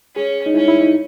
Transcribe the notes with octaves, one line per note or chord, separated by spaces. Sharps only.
C#4 G#4
D#4
C#4 E4
E4
D#4